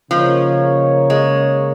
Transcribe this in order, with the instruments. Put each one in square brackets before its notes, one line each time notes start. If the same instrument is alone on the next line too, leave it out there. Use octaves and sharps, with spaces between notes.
[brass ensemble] C#3 A#3 D#4 A#4 C#5 [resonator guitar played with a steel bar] F3
[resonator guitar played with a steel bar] G#3